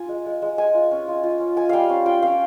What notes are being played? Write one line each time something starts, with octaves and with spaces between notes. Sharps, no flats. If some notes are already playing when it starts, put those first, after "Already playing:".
Already playing: F4 G#5
G#3
G#3
G#3
G#3 G#5
F4
C#4
F4
F4
C#4
F4 G#5
G3 F5 G5
C#4
F4 G5
C#4 F5